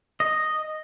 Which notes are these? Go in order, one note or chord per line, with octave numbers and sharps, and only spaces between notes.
D#5